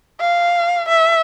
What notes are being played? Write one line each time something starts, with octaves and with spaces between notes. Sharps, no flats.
F5
E5